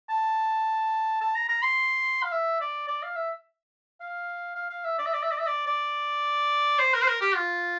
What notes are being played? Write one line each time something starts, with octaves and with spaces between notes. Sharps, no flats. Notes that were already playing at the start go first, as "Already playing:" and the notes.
A5
A5
A#5
A#5
C6
F5
E5
D5
D5
F5
E5
F5
F5
F5
E5
D5
E5
D5
E5
D5
E5
D5
D5
C5
A#4
C5
A#4
G4
F4